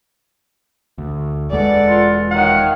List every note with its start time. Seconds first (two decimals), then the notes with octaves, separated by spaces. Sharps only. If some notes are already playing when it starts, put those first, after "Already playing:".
0.98 D2
1.50 E1 G#3 A4 B4 D5 F#5
1.88 F4
2.31 D#3 C#5 F5 F#5 F6